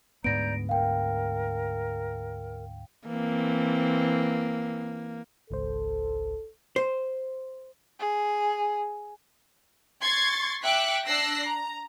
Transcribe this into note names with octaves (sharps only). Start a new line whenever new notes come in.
D2 G#2 B3 D5 A#5 G6 A#6 D7
A#4 F5 G5
E3 A#3 C4
G#1 C#2 A4 C5
C5
G#4
C6 C#6 G#6 A6
E5 G5 D6 F#6 B6 C#7
D4 E6 F#6 A#6 C7
A#5